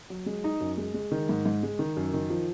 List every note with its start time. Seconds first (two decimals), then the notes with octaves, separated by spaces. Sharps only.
0.10 F#3
0.26 G#3
0.44 D#4
0.60 F#2
0.78 G#3
0.94 G#3
1.12 D#3
1.29 G#2
1.46 G#2
1.63 G#3
1.79 D#3
1.97 F#2
2.14 D#3
2.30 F3